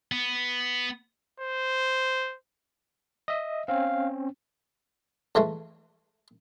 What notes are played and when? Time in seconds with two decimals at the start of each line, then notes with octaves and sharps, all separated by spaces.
0.12 B3
1.40 C5
3.28 D#5 E5
3.68 C4 C#4 F5
5.35 F2 E3 G#3 A3